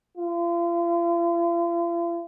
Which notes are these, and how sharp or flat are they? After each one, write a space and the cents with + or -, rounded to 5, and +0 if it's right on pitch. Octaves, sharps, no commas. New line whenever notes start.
F4 -40